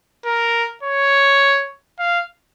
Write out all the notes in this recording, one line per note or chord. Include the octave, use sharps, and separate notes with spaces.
A#4
C#5
F5